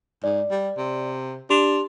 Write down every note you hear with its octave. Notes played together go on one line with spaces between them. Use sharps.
G#2 D5
G3
C3
D4 G4 C6 F7